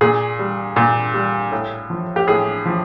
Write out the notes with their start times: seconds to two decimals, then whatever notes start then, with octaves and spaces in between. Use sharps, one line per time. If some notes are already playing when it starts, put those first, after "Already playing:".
0.01 A#2 G#4
0.39 G3
0.76 A#2
1.14 G3
1.52 A2
1.90 F3
2.16 G4
2.27 A2 G#4
2.65 F3